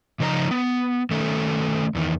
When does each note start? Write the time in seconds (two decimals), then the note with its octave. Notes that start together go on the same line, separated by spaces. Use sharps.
0.20 C#3 F3 D#4 B4 A#5
0.51 B3
1.11 D#3 A3 C#4 A4
1.95 E2 D#3